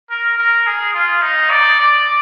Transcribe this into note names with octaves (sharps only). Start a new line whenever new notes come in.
A#4
A#4
G#4
F4
D#4
D5
D5